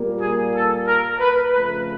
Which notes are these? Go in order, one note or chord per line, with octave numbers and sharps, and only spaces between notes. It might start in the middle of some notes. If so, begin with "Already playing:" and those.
Already playing: A#2 G3 A#3
G#4
A4
A#4
B4
F2 C#3 F3 A3 B4